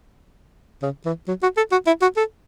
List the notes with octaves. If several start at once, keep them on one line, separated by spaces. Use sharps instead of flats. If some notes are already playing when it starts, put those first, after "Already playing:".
C#3
E3
F#3
F#4
A4
F#4
E4
F#4
A4